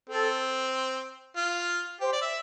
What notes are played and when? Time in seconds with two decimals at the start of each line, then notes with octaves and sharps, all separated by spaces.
0.09 C4 A4
1.36 F4
2.00 G4 C5
2.13 D5
2.22 E5